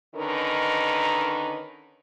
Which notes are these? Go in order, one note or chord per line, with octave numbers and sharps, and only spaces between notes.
D3 D#3 C#4 D#4 A#4 B4